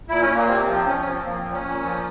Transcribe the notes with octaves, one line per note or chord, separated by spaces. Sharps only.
A#2 E4
C#4
A#2
A#3
C3 C4
C4
F3
C4
F3 C#4
C#4
F3
C4
F3 A#3
C4
A#2
C#4
A#2
F3